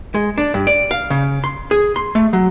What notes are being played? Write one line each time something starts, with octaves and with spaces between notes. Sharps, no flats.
G#3
D4
G2
D5
F5
C#3
C6
G#4
C6
A3
F#3